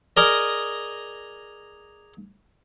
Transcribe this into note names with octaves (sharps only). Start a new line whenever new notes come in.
G#4 A#4 D5 D#5